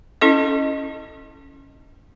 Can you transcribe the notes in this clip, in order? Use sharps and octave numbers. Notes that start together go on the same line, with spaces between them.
C#4 E4 A4 D#5